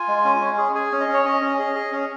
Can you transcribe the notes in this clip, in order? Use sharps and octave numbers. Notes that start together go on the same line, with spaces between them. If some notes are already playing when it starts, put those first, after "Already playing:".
Already playing: F4 G#5
G#3
C#4
C#4
G#4
G#4 G#5
C#4
D#5
C#4
C#5
C#4 D#5
C#4
G#4
G#4
C#4